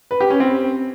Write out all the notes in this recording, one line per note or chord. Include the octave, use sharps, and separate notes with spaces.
B4
G4
C#4
C4